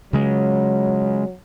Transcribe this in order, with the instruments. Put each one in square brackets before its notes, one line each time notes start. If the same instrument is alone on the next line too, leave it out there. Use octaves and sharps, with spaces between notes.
[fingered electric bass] C#3 G#3 [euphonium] F#3